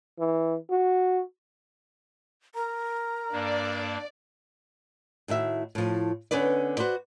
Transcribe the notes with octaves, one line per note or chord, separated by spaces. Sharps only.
E3
F#4
A#4 A#5
G2 A#3 D4 D5
A2 D#3 F#4 E5
A2 F3
D3 B3 C#4 D#4 B4 D5
F#4 B4 C5 D5